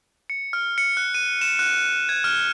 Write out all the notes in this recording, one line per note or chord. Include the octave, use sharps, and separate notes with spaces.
C#7
F6
C#7
F#6
D#7
E7
F#6
G#6
F6